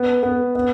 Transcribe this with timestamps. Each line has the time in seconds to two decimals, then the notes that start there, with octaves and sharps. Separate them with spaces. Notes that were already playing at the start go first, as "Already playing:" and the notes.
Already playing: B3
0.23 B3
0.55 B3